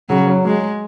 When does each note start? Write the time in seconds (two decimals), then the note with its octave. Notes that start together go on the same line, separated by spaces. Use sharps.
0.09 C#3 F#3
0.27 F#3
0.45 F#3 G#3